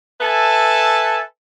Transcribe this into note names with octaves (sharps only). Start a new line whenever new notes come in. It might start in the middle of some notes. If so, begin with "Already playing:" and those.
A4 B4 E5 G#5 A5